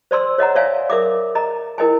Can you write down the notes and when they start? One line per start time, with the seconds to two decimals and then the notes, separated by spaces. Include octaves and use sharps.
0.11 C5 D5 C6 E6
0.38 C#5 D#5 F#5 A#5
0.55 C#5 D5 E5 F5 G#5
0.90 A#4 E5 D6
1.35 D#5 A#5
1.78 E4 A#4 D#5 G5 G#5